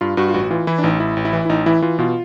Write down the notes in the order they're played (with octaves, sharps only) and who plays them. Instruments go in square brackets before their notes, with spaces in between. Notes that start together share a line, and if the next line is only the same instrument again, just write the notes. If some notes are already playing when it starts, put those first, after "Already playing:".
[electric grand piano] G2 F4
G2 F#4
F4
A1 F#4
E3 F4
E3 E4
D4
A1 D#4
A1 E4
A1
E4
E3
E4
A1 D#4
E3 E4
E3 F4
B2 F4